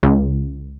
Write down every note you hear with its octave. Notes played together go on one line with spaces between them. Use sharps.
C#2